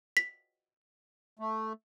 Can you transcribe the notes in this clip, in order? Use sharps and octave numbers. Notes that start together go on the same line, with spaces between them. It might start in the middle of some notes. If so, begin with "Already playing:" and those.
B6
A3